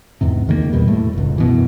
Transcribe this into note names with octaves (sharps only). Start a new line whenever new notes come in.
E2 G#2 C3
C#2 D#3 G#3 A#3
E2 B2 G3
A2 A3
F1 C#2
F#2 B2 E3